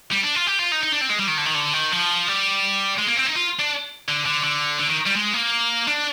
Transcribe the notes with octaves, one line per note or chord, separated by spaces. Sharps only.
G3
D4
F4
G4
F4
D#4
D#4
D4
C4
G#3
G3
D#3
D3
D#3
D3
D#3
F3
G3
G#3
A#3
C4
D#4
F4
D4
D3
D3
D3
D3
D#3
G3
G#3
A#3
D4